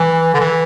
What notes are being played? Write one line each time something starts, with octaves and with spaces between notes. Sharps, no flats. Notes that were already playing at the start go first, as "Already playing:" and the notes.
Already playing: E3
D3
E3